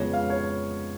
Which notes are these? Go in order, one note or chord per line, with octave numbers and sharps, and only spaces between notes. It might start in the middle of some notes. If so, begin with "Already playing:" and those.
Already playing: F2 C#3 G#3 B3 C#5
F5
C#5